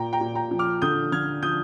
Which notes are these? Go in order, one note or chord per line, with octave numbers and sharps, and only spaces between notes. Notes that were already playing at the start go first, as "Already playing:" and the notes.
Already playing: A#2 G5 A#5
G5 A#5
A#2
G5 A#5
F3
D6 F6
D3 D#6 G6
D3 F6 G#6
F3 D#6 G6